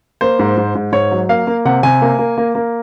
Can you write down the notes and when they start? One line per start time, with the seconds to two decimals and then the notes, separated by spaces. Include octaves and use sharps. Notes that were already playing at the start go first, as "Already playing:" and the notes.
0.21 A#3 C5
0.39 G#2
0.57 G#2
0.75 G#2
0.92 G#2 C#5
1.11 F#3
1.29 A#3 F5
1.47 A#3
1.65 C3 F#5
1.83 C3 G#5
2.02 A#3
2.19 A#3
2.37 A#3
2.55 A#3